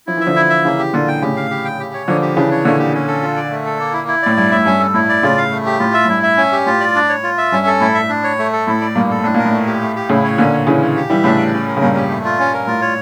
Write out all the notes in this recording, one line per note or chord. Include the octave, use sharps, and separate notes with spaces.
F3 E4
E3 E5
D3 F3
E4
E5
C#3 E3 A#3
G4
A#2 D3 F4
G5
A2 C#3 G4
F5
G4
G5
G4
C#5
D3 F3 A#3
G4
C#3 E3 D4
C#5
A#2 D3 A3
G4
C#4
A4
F4
D5
A3
A4
A#3
E4
E4
A2 D5
G2 E4
A2 E5
G2 C#4
A4
A2 E4
D5
A2 C#3 F4
F5
A3
G4
A2 F4
E5
A2
G2 E4
E5
C#4
G4
A2 F4
D5
D4
C#5
F4
E5
G2 C#4
A4
A2 E4
E5
D4
C#5
A3
A4
A2 E4
D5
G2 A#2 A#3
A4
A2 D4
A#2 A#4
A2
A3
G4
A3
G4
A2 C#3 E4
C#5
A#2 D3 C#4
C#5
C#3 E3 C#4
C#5
G4
E3 G3 E5
A2 C#3 D4
D5
C#4
A#4
C#3
G2 A#2 C#4
G4
A3
F4
C#4
A#4
A2 F4
C#5